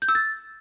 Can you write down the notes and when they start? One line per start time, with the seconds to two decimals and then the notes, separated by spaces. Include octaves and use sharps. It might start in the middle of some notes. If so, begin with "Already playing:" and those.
0.02 G6
0.08 E6
0.15 A6